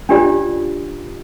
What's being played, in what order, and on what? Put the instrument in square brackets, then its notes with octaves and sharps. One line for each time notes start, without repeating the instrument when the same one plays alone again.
[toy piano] C#4 D4 F4 G4 C#5 D5